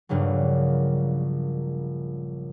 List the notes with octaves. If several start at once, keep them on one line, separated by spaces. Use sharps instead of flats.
A#1 G2 A#2 C#3 F#3